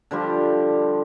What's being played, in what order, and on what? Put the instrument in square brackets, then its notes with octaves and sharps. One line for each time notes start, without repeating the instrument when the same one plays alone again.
[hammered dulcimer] D3 F3 G3 G4